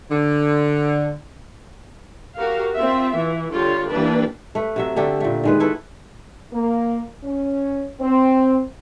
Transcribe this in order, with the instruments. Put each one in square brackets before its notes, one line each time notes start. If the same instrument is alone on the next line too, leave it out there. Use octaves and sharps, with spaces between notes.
[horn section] D3
[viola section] F#4 G4 A#4 F5
C4 F4 E5
E3
D3 G3 F4 G4 C#5
E3 G3 A#3 D4 B4
[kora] A3 B4
C3 F#3 E5
D3 A3 D4 G4
A#2 A3
D#3 G#3 B4
A3 E4 A4 B4
[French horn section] A#3
C#4
C4